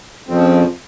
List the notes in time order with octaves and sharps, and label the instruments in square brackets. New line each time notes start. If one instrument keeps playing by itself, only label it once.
[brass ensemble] F2 [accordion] C#3 F3 C4